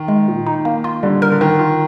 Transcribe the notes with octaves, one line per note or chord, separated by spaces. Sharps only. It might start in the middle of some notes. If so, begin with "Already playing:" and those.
Already playing: D#3
G#3
A#2
D#4
A#3
F4
D3 G3
A#4
D3
D#3 A#4
F4